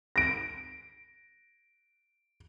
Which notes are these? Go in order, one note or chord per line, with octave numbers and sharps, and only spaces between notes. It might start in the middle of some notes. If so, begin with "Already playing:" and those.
A#6 D7